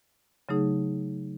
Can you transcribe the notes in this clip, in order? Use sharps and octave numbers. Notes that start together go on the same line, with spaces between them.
C#3 F#3 A3 D#4 G#4